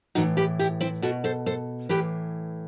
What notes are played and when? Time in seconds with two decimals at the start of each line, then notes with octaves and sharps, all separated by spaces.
0.15 A2 E3 D#4 F#4
0.37 G4 B4
0.59 E4 G4
0.81 C4 E4
1.02 B2 F#4 A4
1.24 A4 C5
1.46 A4 C5
1.89 A2 E3 G4 B4